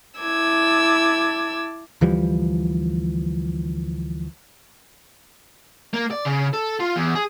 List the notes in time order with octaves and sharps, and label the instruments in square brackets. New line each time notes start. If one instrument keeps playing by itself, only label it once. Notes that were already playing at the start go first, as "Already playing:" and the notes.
[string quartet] E4 A5 D6 E6 G#6
[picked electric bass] D2 E3 F3 G3
[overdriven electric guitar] A#3
D5
C#3
A4
F4
E2
G#4